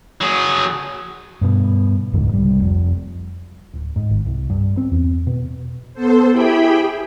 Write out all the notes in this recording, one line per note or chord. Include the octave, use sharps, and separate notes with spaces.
F#3 G#4
G2 B2
E1 C#2 G#2 D3
C2 G3
F1
D1
G#2
G#1
C2
G2
C4
E2
B2
B3 A4 C5
E4 G4 G#4 E5 G5 B5